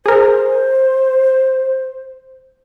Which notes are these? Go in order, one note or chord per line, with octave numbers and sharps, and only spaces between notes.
G#4 A#4 C5